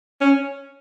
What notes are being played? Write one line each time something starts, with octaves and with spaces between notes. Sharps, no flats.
C#4